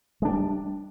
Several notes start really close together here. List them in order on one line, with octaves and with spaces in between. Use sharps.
G#3 D4 G3